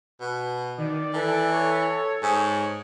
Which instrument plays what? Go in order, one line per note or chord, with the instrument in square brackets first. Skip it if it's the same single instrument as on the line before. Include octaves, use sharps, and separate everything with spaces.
[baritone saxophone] B2
[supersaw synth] D#3 [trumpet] D5
[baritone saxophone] E3 [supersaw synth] A4
[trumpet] C#5
[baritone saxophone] G#2 [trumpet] C#5